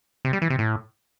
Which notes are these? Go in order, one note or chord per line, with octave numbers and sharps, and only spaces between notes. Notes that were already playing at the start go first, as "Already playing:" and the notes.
C3
G3
E3
C3
A2